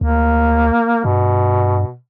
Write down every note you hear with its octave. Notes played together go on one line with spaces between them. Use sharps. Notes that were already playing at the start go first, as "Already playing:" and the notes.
D2 A#3
G2 B2